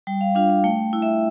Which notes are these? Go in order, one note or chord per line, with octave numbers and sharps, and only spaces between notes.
G3 G5
F5
D4 F4 F5
F5
A3 G5
E4
E5